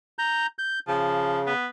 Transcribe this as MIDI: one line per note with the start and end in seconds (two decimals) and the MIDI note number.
0.19 0.47 82
0.19 0.47 91
0.59 0.79 91
0.88 1.54 49
0.88 1.39 53
1.47 1.66 59